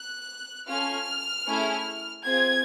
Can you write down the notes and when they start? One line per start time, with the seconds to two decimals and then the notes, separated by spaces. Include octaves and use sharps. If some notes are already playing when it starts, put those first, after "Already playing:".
Already playing: F#6
0.66 C#4 F4 A4 F6
1.46 A3 C#4 E4 G#4
2.25 C4 F4 G#4 G#6